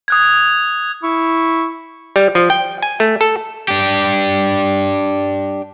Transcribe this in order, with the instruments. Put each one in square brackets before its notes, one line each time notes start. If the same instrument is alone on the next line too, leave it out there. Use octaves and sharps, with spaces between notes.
[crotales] D#6 F#6 G#6
[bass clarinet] E4 [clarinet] C#6
[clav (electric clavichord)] G3
F3
G5
G#5
A3
A4
[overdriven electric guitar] D4 G4